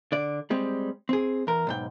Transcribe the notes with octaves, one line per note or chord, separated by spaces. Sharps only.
D3 D5
G3 G#3 C4
C4 G#4
E2 A#4
B1 G#2 G5